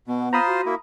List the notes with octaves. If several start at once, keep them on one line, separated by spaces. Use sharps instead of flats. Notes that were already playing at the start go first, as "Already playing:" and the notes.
B2 B3
F4 C5 A#5 B5 D#6
F#4
A#3 E4